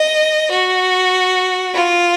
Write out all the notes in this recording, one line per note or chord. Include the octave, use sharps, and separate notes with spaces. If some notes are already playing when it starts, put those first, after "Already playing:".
Already playing: D#5
F#4
F4